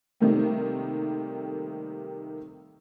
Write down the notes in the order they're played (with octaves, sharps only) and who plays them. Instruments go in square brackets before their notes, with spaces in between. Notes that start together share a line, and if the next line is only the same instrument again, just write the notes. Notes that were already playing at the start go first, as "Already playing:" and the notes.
[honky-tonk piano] C3 D#3 G3 A3 A#3 C4